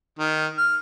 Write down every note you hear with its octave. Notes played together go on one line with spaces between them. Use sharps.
D#3
F6